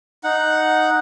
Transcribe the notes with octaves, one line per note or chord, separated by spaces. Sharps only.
D#4 F#5